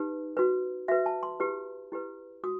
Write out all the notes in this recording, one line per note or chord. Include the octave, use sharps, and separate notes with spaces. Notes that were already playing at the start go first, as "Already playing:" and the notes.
Already playing: D#4 G4 B4
F#4 B4
F#4 B4 E5
A5
C6
E4 G4 B4
E4 G4 B4
F#4 D#6